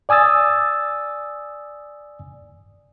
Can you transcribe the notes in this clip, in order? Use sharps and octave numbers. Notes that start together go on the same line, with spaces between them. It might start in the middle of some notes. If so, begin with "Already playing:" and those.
D5 G#5 D#6 E6 A6